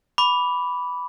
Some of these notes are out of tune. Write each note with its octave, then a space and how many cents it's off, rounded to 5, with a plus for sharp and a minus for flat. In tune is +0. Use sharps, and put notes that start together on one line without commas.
B5 +0 D6 -20